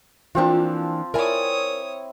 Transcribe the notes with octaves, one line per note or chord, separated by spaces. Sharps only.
E3 F3 A#3 C4 D4 F4
E4 A#4 C#5 D5 G#5 D#6